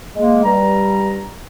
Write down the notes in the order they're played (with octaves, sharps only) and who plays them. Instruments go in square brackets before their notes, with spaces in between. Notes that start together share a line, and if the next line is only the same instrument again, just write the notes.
[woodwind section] G#3 A#3
G2 G3 A#5